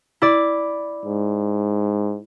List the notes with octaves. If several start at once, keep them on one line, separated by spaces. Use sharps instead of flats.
E4 D5
G#2